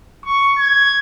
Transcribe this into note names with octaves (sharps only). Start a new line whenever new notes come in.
C#6
G#6